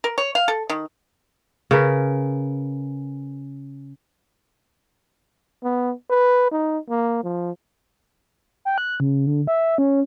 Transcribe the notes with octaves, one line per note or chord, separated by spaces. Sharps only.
A#4
C#5
F5
A4
D#3
C#3 A#4 B4
B3
B4
D#4
A#3
F3
G5
F#6
C#3
D3
E5
C#4